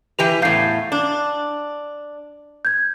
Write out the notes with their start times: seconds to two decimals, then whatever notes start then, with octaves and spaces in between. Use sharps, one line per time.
0.19 E3 G4 B4 F7
0.42 E2 A2 F5 G6 C7
0.92 D4
2.65 G6 G#6